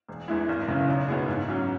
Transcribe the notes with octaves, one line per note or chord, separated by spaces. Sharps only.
E1
E2 E3 G#3 E4
G#1
F#2 C#3 E3 C#4
B1
B2 B3 E4 G#4
G#2
F#3 C#4